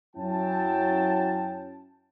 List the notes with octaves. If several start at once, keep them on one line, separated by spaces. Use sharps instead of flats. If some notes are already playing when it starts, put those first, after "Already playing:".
F#2 F#3 C#4 E4 G5 A5